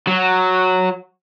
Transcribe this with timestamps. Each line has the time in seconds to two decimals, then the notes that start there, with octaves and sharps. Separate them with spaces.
0.07 F#3